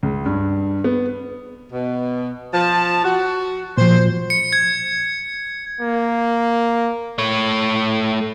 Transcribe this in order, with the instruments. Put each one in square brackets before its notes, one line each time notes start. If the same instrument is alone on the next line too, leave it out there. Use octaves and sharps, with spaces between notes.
[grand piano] C#2
G2
B3
[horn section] B2
F3 A5
F#4
[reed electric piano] A#2 F3 [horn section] C5
[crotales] C#7
G#6
[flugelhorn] A#3
[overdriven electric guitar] A3 C#5